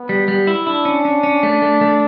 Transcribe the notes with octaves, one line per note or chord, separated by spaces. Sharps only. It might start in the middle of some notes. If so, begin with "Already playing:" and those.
Already playing: B3
G3
G3
E4
D4 E4
C#4
C#4
C#4
A3
A3
A3